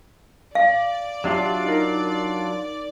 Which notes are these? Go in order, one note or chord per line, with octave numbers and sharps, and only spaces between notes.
D5 F5
F#3 D4 F4 G4 E5 A5
D#4 A#4